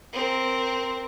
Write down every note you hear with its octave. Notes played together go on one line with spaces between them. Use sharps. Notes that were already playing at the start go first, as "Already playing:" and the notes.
C4 A#4